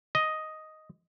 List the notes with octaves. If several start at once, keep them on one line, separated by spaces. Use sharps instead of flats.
D#5